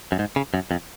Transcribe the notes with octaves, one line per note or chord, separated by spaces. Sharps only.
F#2
G#2
C#3
F#2
F2